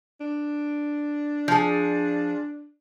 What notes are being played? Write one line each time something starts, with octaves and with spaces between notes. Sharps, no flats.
D4
F3 G#4